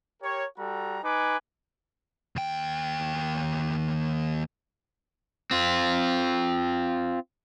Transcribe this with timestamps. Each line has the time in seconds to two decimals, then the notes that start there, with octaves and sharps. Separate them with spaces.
0.22 G4 A#4 C#5
0.57 G3 F#4 A4 A#5
1.03 D#4 B4 G#5 D6
2.36 D#2 G5
5.51 C4 F4